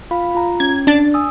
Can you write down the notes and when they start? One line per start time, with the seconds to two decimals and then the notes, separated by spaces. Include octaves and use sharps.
0.11 F4 F5 B5
0.35 F4 A#5
0.60 C#4 G#6
0.87 D4 A6
1.14 G#5 D#6 E6